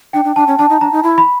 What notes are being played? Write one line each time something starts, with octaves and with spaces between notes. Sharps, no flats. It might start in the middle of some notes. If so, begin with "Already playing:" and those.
D4 G5
D4
D4 A5
C#4
D4 A5
D#4
D4 A#5
D#4
E4
B5